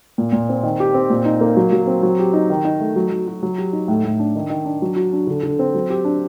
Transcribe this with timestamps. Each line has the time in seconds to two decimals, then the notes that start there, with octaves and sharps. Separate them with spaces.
0.18 A#2
0.33 A#2
0.49 C4
0.63 D#3
0.80 G4
0.94 C4
1.10 A#2
1.25 D#4
1.41 A#3
1.57 F#3
1.72 F#3
1.87 C4
2.02 F#3
2.19 G4
2.33 D#4
2.50 D#3
2.65 D#4
2.80 A3
2.96 F#3
3.11 F#3
3.27 F#4
3.43 F#3
3.58 G4
3.73 D#4
3.88 A2
4.04 A2
4.19 D4
4.36 D#3
4.50 D#3
4.65 D4
4.82 F#3
4.96 F#4
5.13 D4
5.27 D3
5.43 D3
5.59 C4
5.74 F#3
5.90 G4
6.05 D4